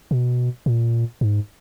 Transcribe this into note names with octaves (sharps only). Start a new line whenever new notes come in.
B2
A#2
G#2